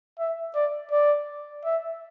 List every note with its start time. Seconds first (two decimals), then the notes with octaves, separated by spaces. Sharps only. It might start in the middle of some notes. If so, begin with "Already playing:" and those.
0.19 E5
0.55 D5
0.91 D5
1.65 E5